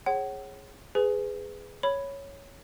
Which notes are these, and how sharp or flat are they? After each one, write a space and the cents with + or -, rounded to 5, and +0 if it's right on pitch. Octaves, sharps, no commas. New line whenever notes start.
G#4 +0 C#5 -20 F#5 +35
G#4 +0 B4 +20 G#5 +10
C#5 +0 B5 +0